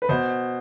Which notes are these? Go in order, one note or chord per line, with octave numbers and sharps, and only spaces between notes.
B4
B2 C5